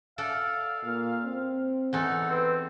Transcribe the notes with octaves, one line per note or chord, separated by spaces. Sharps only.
A4 D5 F5 F#5
A#2
C4
E2 D#4 A4 F#5
C4 B4